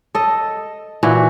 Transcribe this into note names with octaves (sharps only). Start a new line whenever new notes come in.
A4 D#5
A#2 E3 F#4